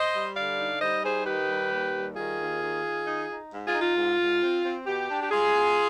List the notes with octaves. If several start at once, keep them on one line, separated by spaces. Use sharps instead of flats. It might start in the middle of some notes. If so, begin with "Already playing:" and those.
Already playing: C5 D#5
G3
D3 D5 F5
D#4
G3 C5 D#5
D#4 G#4 C5
D#3 G4 B4
G3
D#2
G3
D#3 F4 G#4
D#2
D#3
D#3
D#4
D#4
G#2
F4 G#4
D#4
F4
G#2
G#2
C4
C4
B2 G4
D4
G4
G3 F4 G#4
B2